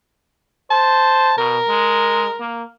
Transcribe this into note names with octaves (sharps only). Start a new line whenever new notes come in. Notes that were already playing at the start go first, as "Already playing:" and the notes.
C5 A5
B2 A#4
G#3
A#3